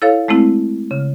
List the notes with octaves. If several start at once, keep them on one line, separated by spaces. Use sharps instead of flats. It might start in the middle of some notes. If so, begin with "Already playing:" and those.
E4 A4 C#5 F5
G#3 A3 C4 E4
C#3